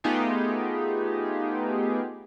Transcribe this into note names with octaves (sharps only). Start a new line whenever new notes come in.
A3 B3 D#4 F4 G4 G#4